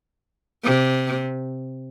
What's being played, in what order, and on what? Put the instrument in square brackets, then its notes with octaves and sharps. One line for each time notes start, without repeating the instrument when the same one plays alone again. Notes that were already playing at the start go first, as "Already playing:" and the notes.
[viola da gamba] C3